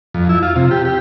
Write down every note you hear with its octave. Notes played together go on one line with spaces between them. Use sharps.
F2
E4
F4
C3
G4
G4